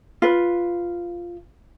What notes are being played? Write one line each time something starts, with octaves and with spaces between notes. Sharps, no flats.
F4 B4